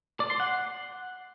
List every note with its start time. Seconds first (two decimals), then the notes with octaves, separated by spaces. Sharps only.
0.20 D5
0.30 C6
0.40 F#5